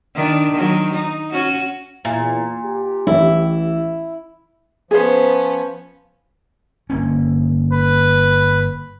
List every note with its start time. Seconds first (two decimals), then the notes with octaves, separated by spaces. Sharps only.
0.15 D#3 D4
0.52 D#3 F#3
0.93 D#4
1.32 C#4 F#4
2.05 E2 A#2 E4
2.64 G4
3.07 A1 E3 E4
4.91 F3 B3 C#4 G#4 C5
6.90 G1 A#3 C#4
7.72 B4